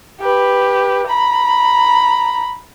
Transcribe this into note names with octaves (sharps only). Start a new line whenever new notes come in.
G4 B4
A#5 B5